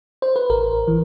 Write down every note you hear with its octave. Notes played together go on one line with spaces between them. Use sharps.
C5
B4
A1 A#4
E3